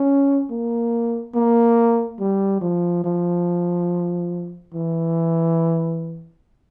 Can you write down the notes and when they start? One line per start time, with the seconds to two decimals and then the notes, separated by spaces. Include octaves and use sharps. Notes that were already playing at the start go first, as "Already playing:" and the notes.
Already playing: C#4
0.50 A#3
1.35 A#3
2.20 G3
2.61 F3
3.04 F3
4.74 E3